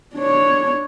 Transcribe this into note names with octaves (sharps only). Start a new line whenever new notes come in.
D4 C#5